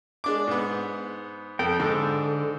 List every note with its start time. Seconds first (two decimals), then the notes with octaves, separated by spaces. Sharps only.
0.24 G#3 D4 D6
0.47 G#2 B3
1.59 F2 G5
1.80 G#2 D3 A4